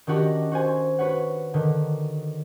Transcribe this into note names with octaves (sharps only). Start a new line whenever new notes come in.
D#3 C#4 D4 F#4 G4 D#5
F#4 C5 G#5
F#4 B4 C#5 F#5
D3 D#3